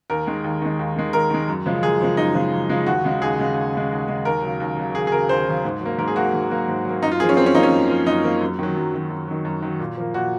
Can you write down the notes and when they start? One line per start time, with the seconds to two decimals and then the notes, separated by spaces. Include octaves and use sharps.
0.10 D#2 A#4
0.27 D#3 G#3
0.44 D#2
0.62 D#3 G#3
0.79 D#2
0.96 D#3 G#3
1.13 D#2 A#4
1.30 D#3 G#3
1.48 F#2
1.66 C#3 F3 G#3
1.83 F#2 G#4
2.01 C#3 F3 G#3
2.17 F#2 D#4
2.35 C#3 F3 G#3
2.52 F#2
2.70 C#3 F3 G#3
2.87 D#2 F#4
3.04 C#3 G#3
3.22 D#2 G#4
3.39 C#3 G#3
3.56 D#2
3.73 C#3 G#3
3.91 D#2
4.08 C#3 G#3
4.25 D#2 A#4
4.42 C#3 F#3
4.60 D#2
4.77 C#3 F#3
4.95 D#2 G#4
5.07 G#4
5.12 C#3 F#3 A#4
5.29 D#2 C5
5.47 C#3 F#3
5.64 G#2
5.81 F#3 A#3
5.98 G#2 A#4
6.08 G#4
6.16 F#3 A#3 F#4
6.34 G#2
6.50 F#3 A#3
6.68 G#2
6.85 F#3 A#3
7.03 F#2 D#4
7.11 F4
7.20 F3 A#3 G#4
7.29 C#4
7.37 F#2 C4
7.46 C#4
7.55 F3 A#3 D#4
7.63 C#4
7.72 F#2
7.90 F3 A#3
8.06 F#2 D#4
8.24 F3 A#3
8.41 F#2
8.59 D#3 F#3
8.76 F#2
8.94 D#3 F#3
9.10 F#2
9.28 D#3 F#3
9.45 F#2
9.62 D#3 F#3
9.80 A#2
9.97 F3 A#3
10.14 A#2 F#4